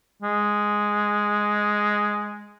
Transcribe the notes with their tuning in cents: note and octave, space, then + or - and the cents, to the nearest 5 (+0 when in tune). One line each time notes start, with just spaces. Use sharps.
G#3 +0